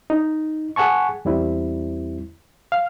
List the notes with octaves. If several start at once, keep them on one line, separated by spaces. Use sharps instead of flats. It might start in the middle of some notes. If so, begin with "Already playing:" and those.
D#4
G#4 F#5 G#5 A5 C#6
E2 G3 C4 E4
F5